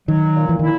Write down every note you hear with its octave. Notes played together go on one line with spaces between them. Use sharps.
D#3 F#3
A#2
E3
D#3 E4